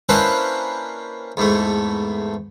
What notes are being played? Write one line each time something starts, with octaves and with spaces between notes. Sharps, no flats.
A#3 C#4 D4 E4 B4 C5
E2 G#2 A3